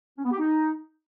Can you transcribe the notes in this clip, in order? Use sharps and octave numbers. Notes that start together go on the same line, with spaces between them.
C#4
B3
G4
D#4